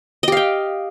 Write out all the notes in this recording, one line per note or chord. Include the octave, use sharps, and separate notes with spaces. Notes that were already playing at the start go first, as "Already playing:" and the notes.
G4 D#5 F5 G5